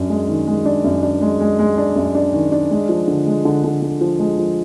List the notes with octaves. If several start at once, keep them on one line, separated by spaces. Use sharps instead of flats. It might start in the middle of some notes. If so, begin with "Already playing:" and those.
Already playing: F#2 D4
G#3
D#3
G#3
D4
F#2
D4
G#3
G#3
G#3
D4
F#2
D4
D#3
D4
G#3
F3
D3
G#3
D3
D3
D3
F3
G#3
F3